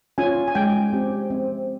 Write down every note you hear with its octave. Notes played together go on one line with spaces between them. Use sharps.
C#4 F4 G#5
G#5
G#3 G5
C4 G4
C4